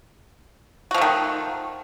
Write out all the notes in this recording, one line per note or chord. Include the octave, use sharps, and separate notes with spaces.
D#3 F3 A3 F#4